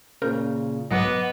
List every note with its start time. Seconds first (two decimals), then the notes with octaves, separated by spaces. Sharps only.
0.22 A#2 C#3 A#4 C5 G6
0.91 B1 G#2 F#3 B3 D#5 F#5 D6